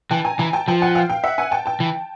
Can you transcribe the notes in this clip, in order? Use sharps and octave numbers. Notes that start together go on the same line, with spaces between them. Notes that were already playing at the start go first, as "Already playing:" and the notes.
E3 G5 A5
G#5 A#5
E3 G#5 A#5
G5 A5
F3 G5 A5
F#5 G#5
F5 G5
F5 G5
E5 F#5
F#5 G#5
G5 A5
G5 A5
E3